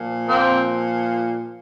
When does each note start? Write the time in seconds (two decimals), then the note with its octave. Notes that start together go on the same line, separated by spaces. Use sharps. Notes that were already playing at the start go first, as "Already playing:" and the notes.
Already playing: A#2 F3
0.28 A#3 C4